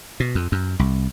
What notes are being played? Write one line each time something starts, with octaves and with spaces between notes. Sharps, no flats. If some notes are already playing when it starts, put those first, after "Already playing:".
B2
F2
F#2
C2